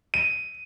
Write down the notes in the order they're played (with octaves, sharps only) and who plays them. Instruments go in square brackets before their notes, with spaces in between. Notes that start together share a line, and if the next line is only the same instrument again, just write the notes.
[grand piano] D#7